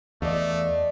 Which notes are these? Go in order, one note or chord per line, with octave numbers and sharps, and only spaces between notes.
E2 A3 D5 D#5 F5